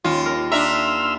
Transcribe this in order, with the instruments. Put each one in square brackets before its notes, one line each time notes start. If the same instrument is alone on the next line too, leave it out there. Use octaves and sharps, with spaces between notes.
[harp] D#2 [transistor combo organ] C#4 [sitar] F4
[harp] A#4
[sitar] D4 E5 [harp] A#5 [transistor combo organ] C6 E6 F6